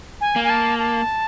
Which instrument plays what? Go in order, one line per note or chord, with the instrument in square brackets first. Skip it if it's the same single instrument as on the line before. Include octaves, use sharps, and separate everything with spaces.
[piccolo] G#5
[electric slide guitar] A#3
[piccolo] G#5
A5
A5